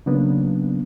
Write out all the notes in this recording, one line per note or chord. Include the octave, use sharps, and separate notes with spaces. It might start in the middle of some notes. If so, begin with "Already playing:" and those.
C#3 F#3 A#3 B3 D4